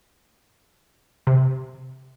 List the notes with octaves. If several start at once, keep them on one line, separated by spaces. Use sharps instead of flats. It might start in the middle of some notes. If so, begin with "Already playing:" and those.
C3